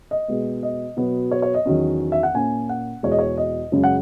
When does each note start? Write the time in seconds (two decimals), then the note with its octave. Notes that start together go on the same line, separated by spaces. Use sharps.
0.11 D#5
0.28 B2 G#3 B3
0.63 D#5
0.97 B2 F#3 B3
1.31 C#5
1.42 C#5
1.54 D#5
1.66 E2 D#3 F#3 C#4
2.12 E5
2.23 F#5
2.34 A#2 A#3 C#4 G#5
2.69 F#5
3.03 E2 B2 G#3 C#5
3.12 D#5
3.19 C#5
3.38 D#5
3.72 F#2 C#3 G#3
3.84 F#5